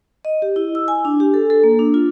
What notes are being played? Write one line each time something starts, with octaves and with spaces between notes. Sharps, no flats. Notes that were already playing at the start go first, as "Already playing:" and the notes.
D#5
G4
E4
E6
G#5
D4
G4
A4
A4
A#3
D4
F4